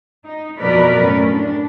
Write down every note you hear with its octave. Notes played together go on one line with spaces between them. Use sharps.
D#4
F2 B2 F#3 A#4 B4 D5
F#2 A2 C#4
D4